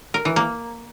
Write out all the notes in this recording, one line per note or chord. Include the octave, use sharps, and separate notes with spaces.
A#4
E3
A#3